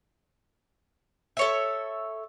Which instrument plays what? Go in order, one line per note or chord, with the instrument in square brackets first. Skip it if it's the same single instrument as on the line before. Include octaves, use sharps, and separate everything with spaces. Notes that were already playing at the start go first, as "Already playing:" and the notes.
[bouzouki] A4 C#5 E5